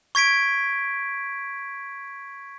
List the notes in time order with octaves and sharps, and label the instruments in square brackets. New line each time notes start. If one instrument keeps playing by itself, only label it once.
[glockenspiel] C#6 G#6 B6 D7